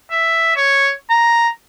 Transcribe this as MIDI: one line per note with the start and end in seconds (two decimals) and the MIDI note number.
0.11 0.51 76
0.56 0.94 73
1.11 1.50 82